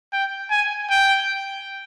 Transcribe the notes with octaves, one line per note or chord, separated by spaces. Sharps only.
G5
G#5
G5